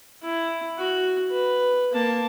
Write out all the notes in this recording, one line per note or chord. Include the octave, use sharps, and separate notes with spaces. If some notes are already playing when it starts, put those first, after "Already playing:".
E4
F#4
B4
A#3 A5